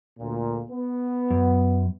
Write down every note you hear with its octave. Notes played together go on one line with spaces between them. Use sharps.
D2 A#2
B3
F#2